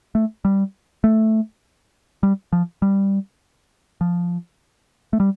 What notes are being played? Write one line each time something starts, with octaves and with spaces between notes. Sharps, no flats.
A3
G3
A3
G3
F3
G3
F3
A3
G3